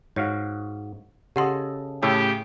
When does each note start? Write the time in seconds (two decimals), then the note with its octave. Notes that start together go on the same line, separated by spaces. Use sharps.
0.16 G#2 F#4 C#5 F5
1.36 C#3 G4 A4 D#5 F#5 C6
2.03 A2 C#3 G4 A4 C#5